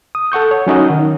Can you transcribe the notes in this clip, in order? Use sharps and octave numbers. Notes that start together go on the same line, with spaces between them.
D#6
A4 F#5 C#6 G6
C#5
F#3 C#4 D#4 F#4 D#5
D#3